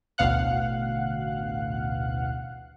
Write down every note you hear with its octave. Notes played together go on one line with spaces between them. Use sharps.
A1 D2 B2 F5 F#5 F#6